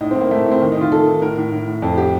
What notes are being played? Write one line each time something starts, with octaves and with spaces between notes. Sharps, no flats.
A2 D#4
C4
A2
A#3
A2 A3
A2
C4
D#3
D#4
D#3 F4
D#3 A4
D#3
A2 A#4
A2
A2
A2
F2 A4
G4